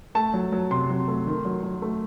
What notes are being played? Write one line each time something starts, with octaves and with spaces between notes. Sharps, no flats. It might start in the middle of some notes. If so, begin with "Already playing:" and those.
A3 A5
F#3
F#3
C3 C6
F#3
A3
D#3
F#3
F#3
A3